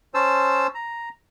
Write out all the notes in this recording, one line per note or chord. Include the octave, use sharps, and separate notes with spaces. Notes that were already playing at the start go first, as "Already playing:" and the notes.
C#4 C5 A5 E6
A#5